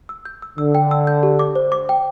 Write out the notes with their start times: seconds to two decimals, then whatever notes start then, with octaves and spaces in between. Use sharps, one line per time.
0.09 E6
0.25 G6
0.42 E6
0.58 D3 E6
0.75 G5
0.91 E6
1.07 G6
1.23 G4
1.39 D6
1.55 C5
1.72 D6
1.89 G5